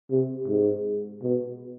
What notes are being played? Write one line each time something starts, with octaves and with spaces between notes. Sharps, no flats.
C3
G#2
B2